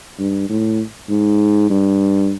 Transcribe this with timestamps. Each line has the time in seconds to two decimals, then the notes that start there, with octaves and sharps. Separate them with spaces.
0.19 G2
0.49 A2
1.09 G#2
1.70 G2